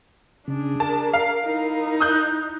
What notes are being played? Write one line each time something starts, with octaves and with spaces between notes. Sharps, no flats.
C#3 D4 G#4
A#4 A5
F5
D#4 E4
D#6 F#6 G6